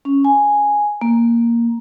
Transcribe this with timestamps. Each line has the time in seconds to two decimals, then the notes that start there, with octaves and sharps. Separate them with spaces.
0.05 C#4
0.25 G#5
1.01 A#3